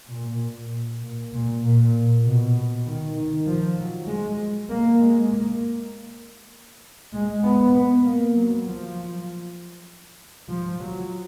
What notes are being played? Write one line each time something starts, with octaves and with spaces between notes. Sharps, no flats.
A#2
A#2
A#2
A#2
B2
B2
D#3
D#3
F3
F#3
G#3
A#3
G#3
A#3
G#3
B3
B3
A#3
F#3
F3
F3
F#3